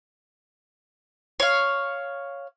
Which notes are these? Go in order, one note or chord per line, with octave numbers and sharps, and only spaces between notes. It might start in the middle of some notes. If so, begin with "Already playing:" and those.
C#5 F5